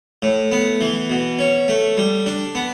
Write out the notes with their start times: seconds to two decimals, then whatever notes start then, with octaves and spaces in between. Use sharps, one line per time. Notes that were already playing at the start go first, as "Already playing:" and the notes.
0.22 A2
0.52 B3
0.81 E3
1.10 B2
1.39 C#4
1.68 A3
1.97 G3
2.26 D4
2.55 B3